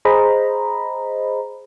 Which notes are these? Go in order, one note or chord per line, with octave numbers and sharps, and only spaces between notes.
G#4 C5 D#5 A#5 B5